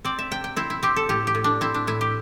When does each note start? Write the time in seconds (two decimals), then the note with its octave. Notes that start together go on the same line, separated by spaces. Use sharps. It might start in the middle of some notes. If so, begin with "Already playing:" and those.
0.05 C4 D5
0.19 E5
0.31 C3 G5
0.44 G5
0.56 C4 E4
0.70 E4
0.83 C4 G4
0.96 A4
1.09 A2 G4
1.27 G4
1.35 A2
1.44 D4
1.61 C4 E4
1.74 D4
1.87 A2 E4
2.01 G4